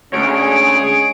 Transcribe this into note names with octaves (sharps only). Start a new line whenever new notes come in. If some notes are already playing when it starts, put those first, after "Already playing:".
D2 G#3 C#4 G#4 C#5 D7